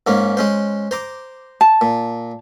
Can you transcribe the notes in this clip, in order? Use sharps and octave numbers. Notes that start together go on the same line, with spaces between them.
G#2 A#3 C#4
G#3 C#4 C5
C5 A#5 D6
A5
A#2